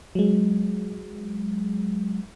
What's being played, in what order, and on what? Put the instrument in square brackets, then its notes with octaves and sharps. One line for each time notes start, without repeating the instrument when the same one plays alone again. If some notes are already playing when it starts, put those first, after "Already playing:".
[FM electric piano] F#3 G#3